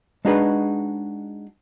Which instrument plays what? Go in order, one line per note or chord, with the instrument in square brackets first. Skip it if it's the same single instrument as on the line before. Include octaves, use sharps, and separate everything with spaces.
[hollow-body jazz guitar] G#3 D4 D#4 F#4 G#4 B4